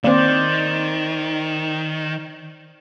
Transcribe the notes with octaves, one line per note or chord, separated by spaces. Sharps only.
D#3 A#3 C4 C5 D5